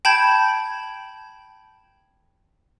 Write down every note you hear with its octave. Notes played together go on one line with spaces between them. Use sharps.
G5 A5 B5 G6 G#6